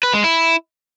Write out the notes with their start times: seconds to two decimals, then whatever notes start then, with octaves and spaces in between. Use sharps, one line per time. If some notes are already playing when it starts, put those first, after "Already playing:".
0.03 B4
0.14 G#3
0.24 E4